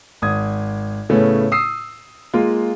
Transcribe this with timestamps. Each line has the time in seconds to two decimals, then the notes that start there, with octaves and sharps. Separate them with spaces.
0.22 G#1 D#6 G#6
1.09 A2 C#3 A3 B3 C#4
1.52 D#6 E6 C7
2.34 G#3 A#3 F4